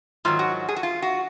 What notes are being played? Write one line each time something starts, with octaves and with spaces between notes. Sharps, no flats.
G#2 D#3 F#3 F4
F#4
G#4
F#4
F4
F#4